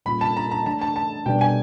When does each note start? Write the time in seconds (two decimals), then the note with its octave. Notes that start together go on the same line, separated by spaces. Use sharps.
0.06 A#2 G3 A#3 C#4 F4 B5
0.21 A5
0.37 A#5
0.51 A#5
0.66 E3 A3 D4 A5
0.81 A5
0.96 A5
1.26 B2 G3 B3 D4 G5
1.41 G#5